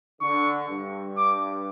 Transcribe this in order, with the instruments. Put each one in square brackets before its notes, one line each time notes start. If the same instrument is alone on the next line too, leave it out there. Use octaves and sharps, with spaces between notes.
[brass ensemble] D3 [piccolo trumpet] C#6
[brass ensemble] G2
[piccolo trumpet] D6